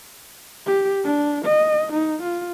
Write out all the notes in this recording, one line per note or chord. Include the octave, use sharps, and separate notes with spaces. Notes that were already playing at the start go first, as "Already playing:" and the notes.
G4
D4
D#5
D#4
F4